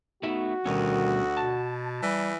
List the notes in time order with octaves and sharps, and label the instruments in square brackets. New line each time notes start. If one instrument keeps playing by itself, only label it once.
[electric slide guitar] A3 D#4 E5 [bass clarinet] B3 [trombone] F#4
[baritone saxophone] D2 [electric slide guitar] B2 G3 C#4 [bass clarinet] D#3
[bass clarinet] B2 [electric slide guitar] A5
[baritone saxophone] E3 [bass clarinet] G3